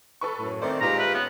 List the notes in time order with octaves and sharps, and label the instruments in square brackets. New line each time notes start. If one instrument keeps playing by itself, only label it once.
[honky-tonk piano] A4 B4 C#6
[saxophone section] F#2 A2
[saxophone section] D#3 A3 C4 [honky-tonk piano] C5 D5
[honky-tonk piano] A#2 D#4 B4 [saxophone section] G#3 F4 G4 [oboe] A#5
[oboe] B4 [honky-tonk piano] E5
[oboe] B3 [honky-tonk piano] C#4